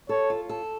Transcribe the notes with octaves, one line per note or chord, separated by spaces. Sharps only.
A4 C#5
F4
A4